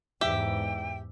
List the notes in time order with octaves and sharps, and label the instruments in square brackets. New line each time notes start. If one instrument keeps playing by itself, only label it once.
[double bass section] E2 G#2 [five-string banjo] G4 [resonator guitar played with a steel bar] E5 [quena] G5